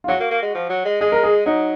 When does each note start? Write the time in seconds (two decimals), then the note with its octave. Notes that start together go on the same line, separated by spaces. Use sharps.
0.04 F4
0.08 F#3 F#4
0.20 A#3
0.31 A#3
0.42 G#3
0.55 F3
0.69 F#3
0.85 G#3
1.01 G#3 G#4
1.12 A#4
1.23 G#4
1.46 F#3 D#4